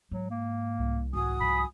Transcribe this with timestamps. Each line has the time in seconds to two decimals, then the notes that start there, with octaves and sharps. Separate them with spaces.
0.11 G#2 F#3
0.31 A#3
0.79 C2
1.13 G#1 F#4 G#5 D#6
1.40 G#2 F3 B5